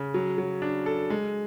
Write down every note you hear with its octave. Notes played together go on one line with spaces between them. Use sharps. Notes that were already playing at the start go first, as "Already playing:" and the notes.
Already playing: C#3
F#3
F#3
D4
A4
G#3